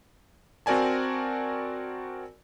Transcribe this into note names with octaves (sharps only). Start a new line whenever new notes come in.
C4 F#4 A#4 D5 G#5 A5